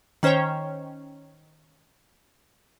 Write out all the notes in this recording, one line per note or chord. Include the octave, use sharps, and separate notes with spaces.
D#3 C#4 C5 C#5 G5